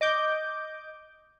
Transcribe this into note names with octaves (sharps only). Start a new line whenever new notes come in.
D#5 D6 G6